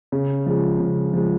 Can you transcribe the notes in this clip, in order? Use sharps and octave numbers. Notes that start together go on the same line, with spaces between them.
C#3
F3 G#3
C#3
F3 G#3